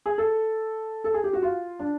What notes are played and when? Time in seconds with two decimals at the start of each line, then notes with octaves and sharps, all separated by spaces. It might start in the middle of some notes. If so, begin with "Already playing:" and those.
0.06 G#4
0.18 A4
1.04 A4
1.14 G#4
1.24 G4
1.33 F#4
1.42 F4
1.79 D4